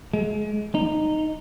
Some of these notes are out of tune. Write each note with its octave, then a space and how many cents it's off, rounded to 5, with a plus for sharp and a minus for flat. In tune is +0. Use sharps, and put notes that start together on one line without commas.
G#3 +25
D#4 -10